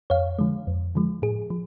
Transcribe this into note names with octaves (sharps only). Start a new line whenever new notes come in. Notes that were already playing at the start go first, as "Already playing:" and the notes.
F2 C#5 F5
D3 F3 G#3
F2
D3 F3 G#3
A2 G#4
F3